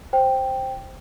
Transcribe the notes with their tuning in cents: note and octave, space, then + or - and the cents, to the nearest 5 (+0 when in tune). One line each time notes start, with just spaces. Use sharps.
C5 +5 G5 +0